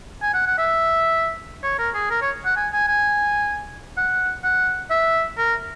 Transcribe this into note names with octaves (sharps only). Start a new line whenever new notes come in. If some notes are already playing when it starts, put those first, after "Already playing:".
G#5
F#5
F#5
E5
C#5
A#4
G#4
A#4
C#5
F#5
G#5
G#5
G#5
F#5
F#5
E5
A#4